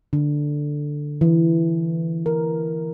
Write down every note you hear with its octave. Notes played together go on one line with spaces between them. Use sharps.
D3
E3
A#4